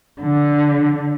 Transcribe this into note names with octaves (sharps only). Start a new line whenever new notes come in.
D3